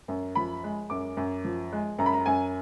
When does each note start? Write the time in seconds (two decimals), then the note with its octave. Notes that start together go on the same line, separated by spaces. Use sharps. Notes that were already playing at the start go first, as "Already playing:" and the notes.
0.08 F#2
0.35 F3 B5
0.64 G#3
0.90 F#2 D6
1.17 F#2
1.45 F3
1.73 G#3
1.98 F#2 A#5
2.06 B5
2.13 A#5
2.26 F#2 G#5